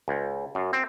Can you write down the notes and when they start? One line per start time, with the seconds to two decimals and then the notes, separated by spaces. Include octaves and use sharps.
0.08 C#2
0.55 F#2
0.73 C4